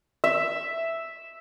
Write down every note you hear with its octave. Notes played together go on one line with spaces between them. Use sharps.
E5